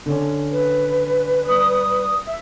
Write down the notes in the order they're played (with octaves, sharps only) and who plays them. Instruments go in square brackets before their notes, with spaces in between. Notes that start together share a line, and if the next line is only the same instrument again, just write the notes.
[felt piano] D3 C#4
[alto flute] B4
[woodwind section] G3 D#6
E5